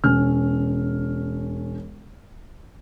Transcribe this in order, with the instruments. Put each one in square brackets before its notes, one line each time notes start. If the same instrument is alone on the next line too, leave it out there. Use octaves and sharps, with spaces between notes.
[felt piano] E1 C#4 F6